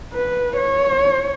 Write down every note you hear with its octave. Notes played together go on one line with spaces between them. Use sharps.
B4
C#5